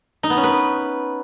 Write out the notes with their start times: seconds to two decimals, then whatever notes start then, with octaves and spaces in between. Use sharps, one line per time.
0.23 D#4
0.30 B3
0.37 C#4
0.44 B4